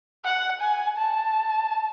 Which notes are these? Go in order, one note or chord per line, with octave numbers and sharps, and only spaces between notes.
F#5
G#5
A5